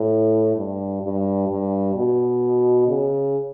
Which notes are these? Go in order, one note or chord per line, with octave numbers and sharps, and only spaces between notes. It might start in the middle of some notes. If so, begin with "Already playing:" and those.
Already playing: A2
G2
G2
G2
B2
C#3